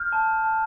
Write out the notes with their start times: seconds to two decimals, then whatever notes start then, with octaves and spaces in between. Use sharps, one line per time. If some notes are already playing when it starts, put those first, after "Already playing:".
Already playing: F6 G6
0.12 A5
0.44 A5